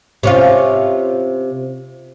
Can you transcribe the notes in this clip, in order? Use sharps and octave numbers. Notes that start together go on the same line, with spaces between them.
C3 C#4 F4